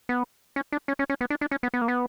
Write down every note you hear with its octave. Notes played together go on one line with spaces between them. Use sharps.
B3
C#4
D4
C#4
C#4
C#4
B3
D4
D4
C#4
B3
B3
A#3
B3